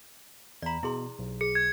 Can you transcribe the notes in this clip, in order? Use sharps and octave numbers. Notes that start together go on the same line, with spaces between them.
E2 D5 A#5 B5
B2 E4 G#4 C6
B1
G#4 C#7
G#6